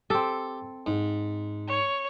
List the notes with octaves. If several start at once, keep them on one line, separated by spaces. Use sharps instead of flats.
C4 G4 A4 G5
G#2
C#5